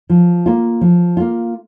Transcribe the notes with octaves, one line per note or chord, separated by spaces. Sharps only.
F3
A#3 F4
F3
A#3 F4